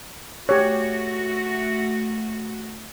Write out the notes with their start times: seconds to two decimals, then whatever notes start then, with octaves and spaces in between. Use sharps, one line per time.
0.49 A3 F#4 G4 C#5